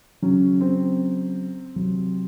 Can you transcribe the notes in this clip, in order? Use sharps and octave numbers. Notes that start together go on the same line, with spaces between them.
C#3 F#3 C#4
C4
C3 F#3